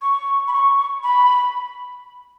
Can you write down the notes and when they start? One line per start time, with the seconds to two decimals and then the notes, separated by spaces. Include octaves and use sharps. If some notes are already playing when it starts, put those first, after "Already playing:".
0.02 C#6
0.48 B5
0.53 C#6
1.03 B5